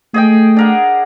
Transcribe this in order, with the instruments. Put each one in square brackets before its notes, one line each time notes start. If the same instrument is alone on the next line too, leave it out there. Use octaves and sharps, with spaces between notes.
[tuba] A3 [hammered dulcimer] G#4 D#5 G5
[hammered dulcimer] D4 A#4 F#5